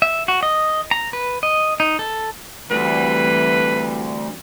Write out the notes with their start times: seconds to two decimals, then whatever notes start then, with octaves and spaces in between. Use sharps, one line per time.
0.02 E5
0.28 F#4
0.43 D#5
0.91 A#5
1.13 B4
1.43 D#5
1.80 D#4
1.99 A4
2.71 D2 E3 G3 C4 B4